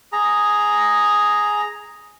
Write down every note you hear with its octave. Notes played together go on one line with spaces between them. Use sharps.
G#4 A#5